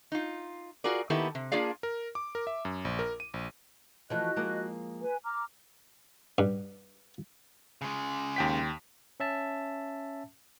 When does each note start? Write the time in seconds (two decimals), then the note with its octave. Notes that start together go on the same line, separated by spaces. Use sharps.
0.12 D#4 F4
0.84 F4 F#4 G#4 A#4 D5
1.10 D#3 A#3 B3 E4 G4 A4
1.35 C3
1.52 A#3 D4 F4 G#4 D5 F5
1.83 A#4
2.15 D6
2.35 A#4
2.47 E5
2.65 F#2
2.85 A#1
2.99 A#4
3.20 D#7
3.34 A#1
4.10 E3 F3 A3 F#4 D#5 F#6
4.36 F3 G#3 A#3
5.01 B4 G#5
5.24 A#5 D6 F6
6.38 G2
7.82 C#3 G#3
8.36 D#2 G5 B6
9.20 C#4 E5 A5